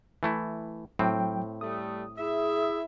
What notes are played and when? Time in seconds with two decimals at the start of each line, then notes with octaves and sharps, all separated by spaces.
0.23 E3 A3 E4
0.99 A2 F#3 C4 G5
1.61 G3 A3 D#6
2.18 E4 G#4 E5